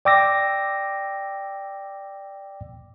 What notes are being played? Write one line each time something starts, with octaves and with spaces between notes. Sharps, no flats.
D5 G5 D6 E6 A#6